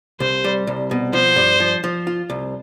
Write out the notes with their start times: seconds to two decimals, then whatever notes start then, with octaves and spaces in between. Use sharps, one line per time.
0.20 C2 C5
0.44 G3
0.67 C2
0.91 B2
1.13 F3 C5
1.36 G2
1.60 F3
1.84 F3
2.07 F4
2.30 C2